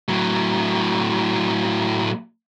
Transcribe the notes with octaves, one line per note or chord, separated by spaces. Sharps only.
A2 F#3